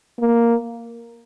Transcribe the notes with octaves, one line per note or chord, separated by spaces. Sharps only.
A#3